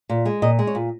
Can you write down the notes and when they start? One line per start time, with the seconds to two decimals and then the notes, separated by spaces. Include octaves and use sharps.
0.09 A#2
0.25 G#3
0.42 A#2 D#5
0.59 G#3
0.67 C#5
0.75 A#2